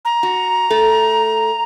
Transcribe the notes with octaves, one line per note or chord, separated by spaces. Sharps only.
A#5
F#4
A3 A4